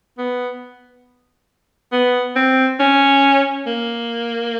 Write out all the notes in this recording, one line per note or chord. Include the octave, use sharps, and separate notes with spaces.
B3
B3
C4
C#4
A#3